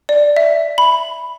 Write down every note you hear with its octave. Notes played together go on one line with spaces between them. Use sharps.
D5
E5
B5